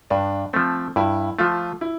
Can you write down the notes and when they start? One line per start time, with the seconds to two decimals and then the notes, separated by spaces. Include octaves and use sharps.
0.10 G2 D4
0.53 F3 A3 C4
0.96 G2 E4
1.39 F3 A3 F4
1.81 E4